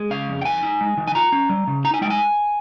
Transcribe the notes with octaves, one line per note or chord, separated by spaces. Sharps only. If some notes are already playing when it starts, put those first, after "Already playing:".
Already playing: G#3
C#3 F5
F2
G5
D#3 G#5
D#4
G#3
D#3
G#5
F4 A#5
C#4
G3
C#3
D#4 A#5
G#5
G#3 G5
G#5